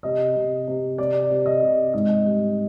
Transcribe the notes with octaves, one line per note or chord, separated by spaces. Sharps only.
C3 D#5
C3
C3
C3 D5
C3
D#5
C3
G#2 D#5
G3